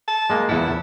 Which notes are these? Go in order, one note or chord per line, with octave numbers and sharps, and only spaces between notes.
A5
G#3 A#3
E2 E4 F#5 A5